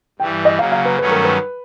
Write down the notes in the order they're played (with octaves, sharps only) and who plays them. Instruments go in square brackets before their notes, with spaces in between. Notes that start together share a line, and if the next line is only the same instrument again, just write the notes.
[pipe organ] G2 E3 G3 [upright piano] G5
[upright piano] D#5
[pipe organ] C#3 F#3 A#3 [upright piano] F5
[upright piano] F5
B4
[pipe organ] G2 D#3 F#3 A3 C#4 [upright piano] B4
[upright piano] A#4
B4